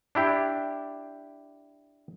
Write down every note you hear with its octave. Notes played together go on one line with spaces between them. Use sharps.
D4 E4 G4